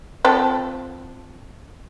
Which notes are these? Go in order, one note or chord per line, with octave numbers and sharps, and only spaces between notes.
F3 C4 A4